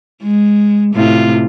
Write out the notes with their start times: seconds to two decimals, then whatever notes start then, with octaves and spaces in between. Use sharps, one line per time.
0.22 G#3
0.94 A2 C3 F4